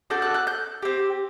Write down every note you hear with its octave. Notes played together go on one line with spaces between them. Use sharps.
D4 F#4 A4 G6
F#6
F#6
G6
C4 G4